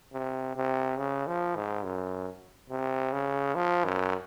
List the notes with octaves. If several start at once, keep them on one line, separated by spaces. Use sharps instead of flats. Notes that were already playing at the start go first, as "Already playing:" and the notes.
C3
C3
C#3
F3
G#2
F#2
C3
C#3
F3
F#2